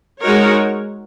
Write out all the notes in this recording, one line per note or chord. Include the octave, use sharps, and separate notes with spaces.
G#3 D#4 F#4 A#4 C#5